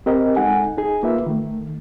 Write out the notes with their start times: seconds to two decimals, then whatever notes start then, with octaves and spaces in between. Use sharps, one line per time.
0.06 C4 G4 A#4 D#5
0.36 G#3 D#4 A4 F#5 G#5
0.77 D#4 G#4
1.03 A#3 F4 B4 E5
1.26 D#3 A3